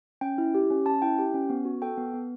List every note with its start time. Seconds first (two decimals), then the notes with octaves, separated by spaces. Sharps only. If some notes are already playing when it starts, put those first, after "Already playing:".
0.21 C#4 G5
0.38 E4
0.54 G4
0.70 C#4
0.86 C#4 A5
1.02 E4 G5
1.18 G4 G5
1.34 C#4
1.50 B3
1.65 F#4
1.82 A4 G5
1.97 B3
2.14 B3